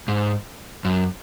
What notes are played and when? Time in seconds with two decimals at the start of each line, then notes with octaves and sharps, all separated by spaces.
0.08 G#2
0.85 F#2